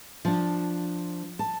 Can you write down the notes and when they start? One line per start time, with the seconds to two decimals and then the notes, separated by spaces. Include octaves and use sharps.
0.25 F3 D4
1.39 A5